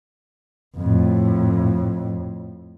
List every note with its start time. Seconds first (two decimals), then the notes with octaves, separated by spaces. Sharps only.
0.77 F2 A2